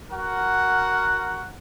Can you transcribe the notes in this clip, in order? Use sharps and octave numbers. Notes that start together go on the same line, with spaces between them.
F#4 A#4 F#5